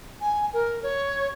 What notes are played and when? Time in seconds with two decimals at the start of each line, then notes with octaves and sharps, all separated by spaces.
0.21 G#5
0.53 A#4
0.83 C#5